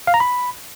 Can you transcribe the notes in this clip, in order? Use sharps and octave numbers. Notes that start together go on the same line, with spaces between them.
F5
A#5
B5